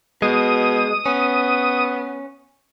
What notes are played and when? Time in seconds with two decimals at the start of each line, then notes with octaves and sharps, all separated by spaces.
0.22 B2 G#3 D#6
1.06 B3 C#4